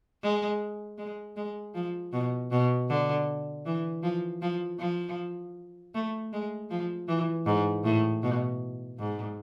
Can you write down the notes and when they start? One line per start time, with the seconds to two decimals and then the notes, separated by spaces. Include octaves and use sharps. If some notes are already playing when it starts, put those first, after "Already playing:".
0.23 G#3
0.98 G#3
1.36 G#3
1.75 F3
2.13 B2
2.51 B2
2.89 D3
3.66 E3
4.03 F3
4.42 F3
4.79 F3
5.95 A3
6.33 G#3
6.70 F3
7.08 E3
7.46 G#2
7.85 A2
8.23 B2
8.99 G#2